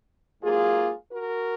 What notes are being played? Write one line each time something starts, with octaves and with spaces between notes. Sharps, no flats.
G#2 F#3 A#3 F4 G#4
F#4 A#4